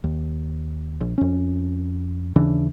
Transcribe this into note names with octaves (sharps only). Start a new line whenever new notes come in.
D#2
A#1
F2 C#4
D#2 C#3 E3 D4